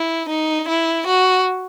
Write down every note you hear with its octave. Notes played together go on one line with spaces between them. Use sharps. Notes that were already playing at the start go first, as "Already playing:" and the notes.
Already playing: E4
D#4
E4
F#4